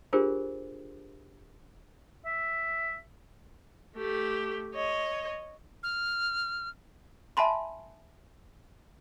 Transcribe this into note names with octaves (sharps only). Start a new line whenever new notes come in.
D4 F4 G4 G#4 A#4 C5
E5
A3 G4
C#5 D#5
F6
E5 G#5 A5 B5 C6